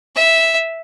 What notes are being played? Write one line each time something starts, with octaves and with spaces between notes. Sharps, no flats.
E5